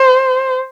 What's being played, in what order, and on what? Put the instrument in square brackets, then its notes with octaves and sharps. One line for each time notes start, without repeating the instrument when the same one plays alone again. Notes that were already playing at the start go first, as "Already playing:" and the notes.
Already playing: [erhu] C5